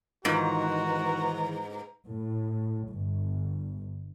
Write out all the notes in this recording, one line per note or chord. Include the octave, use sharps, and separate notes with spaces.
G#2 D#3 E3 F4 F#4 B4 A#5
A2
G1